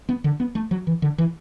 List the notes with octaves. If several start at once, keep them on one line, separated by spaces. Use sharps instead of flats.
B3
D3
B3
A3
F#3
E3
D3
E3